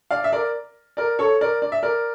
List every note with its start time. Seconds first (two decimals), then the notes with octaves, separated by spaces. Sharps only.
0.11 D5 F5
0.24 E5
0.33 A#4 D5
0.97 A#4 D5
1.19 A4 C#5
1.41 A#4 D5
1.62 D5
1.72 E5
1.83 A#4 D5